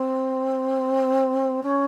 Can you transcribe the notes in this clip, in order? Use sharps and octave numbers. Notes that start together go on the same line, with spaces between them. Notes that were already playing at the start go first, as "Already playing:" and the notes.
Already playing: C4
C#4